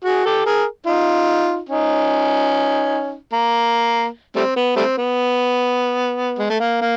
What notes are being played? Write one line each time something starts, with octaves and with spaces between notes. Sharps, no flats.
F#4 G#4
G4 A4
G#4 A#4
D#4 F4
C#4 D#4
A#3
G3 A3 C4
B3
G3 A3 C4
B3
G#3
A3
A#3
A#3